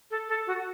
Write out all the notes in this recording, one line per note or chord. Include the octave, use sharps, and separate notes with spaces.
A4
A4
F#4